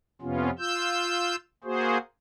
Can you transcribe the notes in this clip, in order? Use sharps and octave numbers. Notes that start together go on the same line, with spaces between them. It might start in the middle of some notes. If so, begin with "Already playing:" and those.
F2 C3 B3 C#4 F4
F4 E6 G6
A#3 F#4 G#4 C5